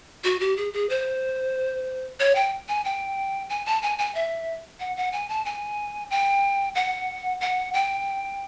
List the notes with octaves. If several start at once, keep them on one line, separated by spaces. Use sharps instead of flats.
F#4
G4
G#4
G#4
C5
C#5
G5
G#5
G5
G#5
A5
G#5
G#5
E5
F#5
F#5
G#5
A5
G#5
G5
F#5
F#5
G5